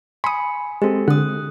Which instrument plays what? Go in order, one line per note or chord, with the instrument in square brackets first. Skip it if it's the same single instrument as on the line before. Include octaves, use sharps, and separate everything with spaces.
[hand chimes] G#5 C#7 [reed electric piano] B5 [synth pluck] C6 D#6
[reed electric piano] G#3 C4 [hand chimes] G4 A4
[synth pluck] D3 [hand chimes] D#6 F#6